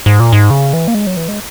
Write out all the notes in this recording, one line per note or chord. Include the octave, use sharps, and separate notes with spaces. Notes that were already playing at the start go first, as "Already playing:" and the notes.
G#2
A#2
G#2
C#3
E3
A#3
G#3
F#3
E3
G#3